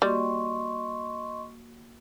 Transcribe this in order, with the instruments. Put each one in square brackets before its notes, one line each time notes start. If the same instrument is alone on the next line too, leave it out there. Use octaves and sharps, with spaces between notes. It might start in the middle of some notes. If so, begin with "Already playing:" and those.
[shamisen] G3 [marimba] A#3 F#4 [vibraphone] D#5 C6 C#6